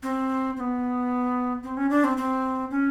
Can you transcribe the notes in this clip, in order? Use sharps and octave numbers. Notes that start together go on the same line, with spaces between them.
C4
C4
B3
C4
C#4
D4
C4
C4
C#4